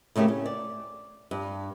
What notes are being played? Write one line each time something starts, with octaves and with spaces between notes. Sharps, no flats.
A2 C#3 A3 A#3 G4
C#4
D5
G2